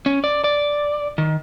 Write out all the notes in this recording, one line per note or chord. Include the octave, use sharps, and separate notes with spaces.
C#4
D5
D5
D#3